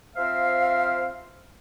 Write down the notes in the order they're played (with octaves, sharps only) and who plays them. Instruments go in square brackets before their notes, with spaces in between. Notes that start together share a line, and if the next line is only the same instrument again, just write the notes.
[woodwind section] F3 C4 C5 E5 F5